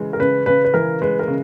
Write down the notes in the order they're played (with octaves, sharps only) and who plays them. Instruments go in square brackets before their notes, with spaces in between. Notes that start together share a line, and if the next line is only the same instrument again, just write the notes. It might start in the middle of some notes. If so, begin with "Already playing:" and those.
Already playing: [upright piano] C#3 E3 G#3
[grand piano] A#4
[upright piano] C#3 [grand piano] B4
[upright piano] C#3 [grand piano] B4
[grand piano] B4
[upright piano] E3 [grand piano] A#4
[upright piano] G#3 [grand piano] B4
[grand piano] A#4
[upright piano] C#3